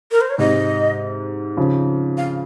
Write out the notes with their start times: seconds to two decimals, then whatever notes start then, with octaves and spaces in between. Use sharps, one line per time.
0.11 A#4
0.21 C5
0.30 C#5
0.38 G#2 C3 D#5
1.57 C#3 F3
2.17 F5